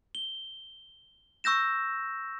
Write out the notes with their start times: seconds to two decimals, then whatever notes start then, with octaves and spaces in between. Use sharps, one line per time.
0.15 G7
1.44 C#6 E6 G6 A#6 E7